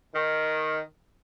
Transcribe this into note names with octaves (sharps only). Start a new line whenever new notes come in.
D#3